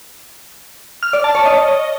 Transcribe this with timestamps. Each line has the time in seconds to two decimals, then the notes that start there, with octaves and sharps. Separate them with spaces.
1.03 F6
1.13 D5
1.24 A5
1.35 C#5
1.46 D#5